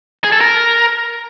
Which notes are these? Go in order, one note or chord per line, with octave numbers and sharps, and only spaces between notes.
G#4
A4
A#4